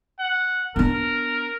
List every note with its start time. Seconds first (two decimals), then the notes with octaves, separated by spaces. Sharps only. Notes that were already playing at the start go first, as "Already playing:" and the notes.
0.19 F#5
0.76 B3 D4 A#4